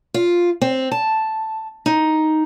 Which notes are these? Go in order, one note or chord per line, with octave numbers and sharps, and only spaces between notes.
F4
C4
A5
D#4